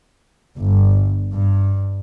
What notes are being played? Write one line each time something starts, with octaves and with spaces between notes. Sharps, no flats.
G1
G2